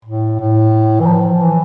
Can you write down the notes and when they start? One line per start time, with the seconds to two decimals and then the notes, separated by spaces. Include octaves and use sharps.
0.05 A2
0.39 A2
1.00 E3
1.06 F3
1.40 E3